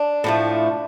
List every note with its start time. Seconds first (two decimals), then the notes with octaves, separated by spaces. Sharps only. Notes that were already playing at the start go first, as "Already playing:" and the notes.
Already playing: D4
0.24 A2 F3 A3